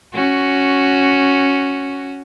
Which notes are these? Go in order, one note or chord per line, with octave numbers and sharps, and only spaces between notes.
C#4 F#4